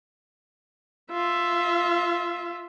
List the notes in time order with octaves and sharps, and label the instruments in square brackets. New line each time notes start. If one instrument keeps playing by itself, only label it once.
[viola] F4 E5